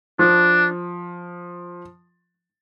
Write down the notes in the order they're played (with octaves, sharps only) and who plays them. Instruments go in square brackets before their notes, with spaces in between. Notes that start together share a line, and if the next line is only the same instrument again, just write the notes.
[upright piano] F3 [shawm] D4